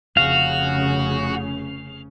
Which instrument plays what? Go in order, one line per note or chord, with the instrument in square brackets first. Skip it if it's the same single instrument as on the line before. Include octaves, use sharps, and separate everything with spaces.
[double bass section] F1 C#3 C#4 [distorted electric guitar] F#4 [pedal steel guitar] F5